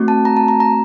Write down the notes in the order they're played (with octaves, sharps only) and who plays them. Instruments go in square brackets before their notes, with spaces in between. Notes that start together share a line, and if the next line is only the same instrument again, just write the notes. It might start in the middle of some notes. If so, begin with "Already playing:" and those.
Already playing: [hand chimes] A3 C4 F#4
A5
A#5
A5
A#5
A#5